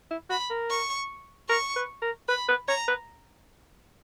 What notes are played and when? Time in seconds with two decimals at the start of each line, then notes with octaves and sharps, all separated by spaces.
0.11 E4
0.30 F#4 B5
0.50 A#4
0.70 C#6
1.49 A#4 C#6
1.76 B4
2.02 A#4
2.28 B4 B5
2.48 B4
2.68 C#5 A#5
2.88 B4